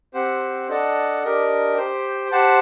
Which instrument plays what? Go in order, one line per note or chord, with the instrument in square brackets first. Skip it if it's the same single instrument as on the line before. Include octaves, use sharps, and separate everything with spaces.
[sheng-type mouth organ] C4 G4 C5 F#5
D4 A4 D#5 F#5 A5
D4 G4 A#4 D#5
G4 C5 G5
G4 C5 F#5 A5